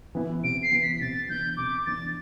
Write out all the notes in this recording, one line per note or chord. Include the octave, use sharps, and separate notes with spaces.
E3 B3 E4
C3 D7
C7
E3 B3 E4
B6
B6
C3 A6
E3 B3 D4 G6
C3 D6
E3 B3 D4 A6